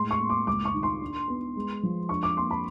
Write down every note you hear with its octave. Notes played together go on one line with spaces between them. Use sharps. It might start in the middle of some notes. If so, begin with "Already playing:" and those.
Already playing: A2 G#3 C6
C#6
A#3
D6
C#2 D6
C#6
D#3
C6
D4
B3
G#3
F3
D4 C#6
D6
A#3 C6
B5